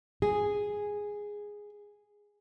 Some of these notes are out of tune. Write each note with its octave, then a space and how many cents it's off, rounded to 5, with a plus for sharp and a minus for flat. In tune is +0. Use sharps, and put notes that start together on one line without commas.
G#4 -5